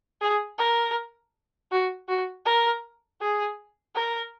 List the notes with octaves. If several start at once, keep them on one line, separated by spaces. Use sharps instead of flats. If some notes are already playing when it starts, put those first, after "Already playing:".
G#4
A#4
F#4
F#4
A#4
G#4
A#4